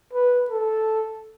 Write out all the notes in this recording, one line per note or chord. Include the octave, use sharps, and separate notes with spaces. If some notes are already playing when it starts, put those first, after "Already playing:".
B4
A4